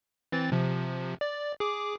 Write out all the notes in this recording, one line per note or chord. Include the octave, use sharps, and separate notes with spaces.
E3 C4 A6
C3 F3
D5
G#4 D6